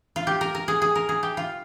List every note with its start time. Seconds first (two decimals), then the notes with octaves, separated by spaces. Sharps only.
0.16 F4
0.27 G4
0.41 A#4
0.55 A#4
0.68 G#4
0.82 G#4
0.95 A#4
1.09 G#4
1.23 G4
1.37 F4